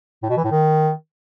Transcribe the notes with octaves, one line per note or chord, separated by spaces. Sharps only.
A2
B2
E3
A2
D#3